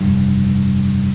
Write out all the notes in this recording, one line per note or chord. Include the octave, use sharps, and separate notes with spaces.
F1 G2